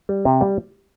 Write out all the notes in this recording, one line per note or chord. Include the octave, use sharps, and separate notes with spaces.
G3
C3
G3